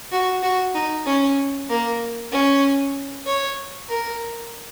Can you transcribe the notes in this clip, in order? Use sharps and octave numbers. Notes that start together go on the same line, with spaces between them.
F#4
F#4
D#4
C#4
A#3
C#4
C#5
A#4